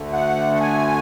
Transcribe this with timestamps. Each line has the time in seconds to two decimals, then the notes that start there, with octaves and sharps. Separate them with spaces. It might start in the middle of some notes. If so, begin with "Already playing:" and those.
Already playing: D2 D3 A3
0.13 F#5
0.55 F#5
0.60 G#5